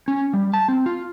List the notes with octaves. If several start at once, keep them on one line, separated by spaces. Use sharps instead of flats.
C#4
G3
A5
C4
F4